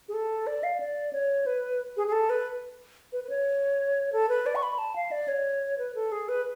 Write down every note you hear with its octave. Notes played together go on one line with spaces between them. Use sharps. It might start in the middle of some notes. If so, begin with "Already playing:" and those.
G#4
A4
D5
F5
D5
C#5
B4
G#4
G#4
A4
B4
B4
B4
C#5
A4
B4
D5
C#6
B5
A5
F5
D5
C#5
B4
A4
G#4
B4